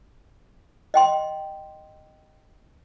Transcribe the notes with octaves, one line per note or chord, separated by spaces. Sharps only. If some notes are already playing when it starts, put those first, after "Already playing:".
D#5 G5 C6